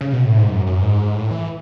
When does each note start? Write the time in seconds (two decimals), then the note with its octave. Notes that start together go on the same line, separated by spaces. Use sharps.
0.01 C#3
0.13 B2
0.25 A2
0.38 G#2
0.50 F#2
0.66 F#2
0.82 G#2
1.15 A2
1.31 E3